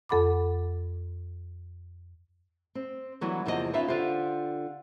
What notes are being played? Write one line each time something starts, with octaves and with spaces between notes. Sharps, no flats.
F2 A4 F#5 B5 D6
C4
D3 E3 F#3 G3 B3
E2 C3 F3 A#3 G#4 D#5
B3 C#4 D#4 F4 E5
D3 F4 G4 C5